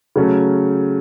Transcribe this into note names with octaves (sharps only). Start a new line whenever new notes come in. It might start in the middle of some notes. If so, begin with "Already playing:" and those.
C#3 F#3 A3 C#4